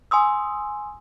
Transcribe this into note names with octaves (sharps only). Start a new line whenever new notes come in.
G#5 C6 D#6 E6